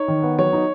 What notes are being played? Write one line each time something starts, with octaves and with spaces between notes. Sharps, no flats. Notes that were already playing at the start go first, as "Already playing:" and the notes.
Already playing: D#4 C#5
D#3
B3
F#3 C#5
D#4